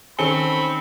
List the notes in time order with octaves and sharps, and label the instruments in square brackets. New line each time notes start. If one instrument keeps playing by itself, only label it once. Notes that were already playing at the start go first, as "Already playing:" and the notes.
[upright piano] D#3 C#4 A4 [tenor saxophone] C4 [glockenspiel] G#5 C#7 G7 [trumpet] B5